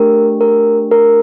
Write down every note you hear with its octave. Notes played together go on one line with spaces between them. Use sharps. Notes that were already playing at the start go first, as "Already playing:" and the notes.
Already playing: A3 D4 G4 A#4
A#4
A#4